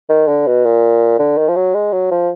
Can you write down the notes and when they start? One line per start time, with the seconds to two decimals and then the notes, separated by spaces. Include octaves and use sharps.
0.10 D#3
0.28 D3
0.47 B2
0.65 A#2
1.19 D3
1.38 D#3
1.48 F3
1.56 F#3
1.74 G#3
1.92 F#3
2.11 F3